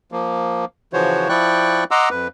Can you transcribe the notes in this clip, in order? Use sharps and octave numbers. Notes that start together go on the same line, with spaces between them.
F3 A#3
C#3 E3 F3 F#4 C5 C#5
F3 E4 D5 G5 C#6 F#6
D#5 F#5 A#5 C6 D6 E6
F2 B4